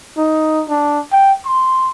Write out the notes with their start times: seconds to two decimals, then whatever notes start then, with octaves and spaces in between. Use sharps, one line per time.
0.18 D#4
0.70 D4
1.12 G5
1.45 C6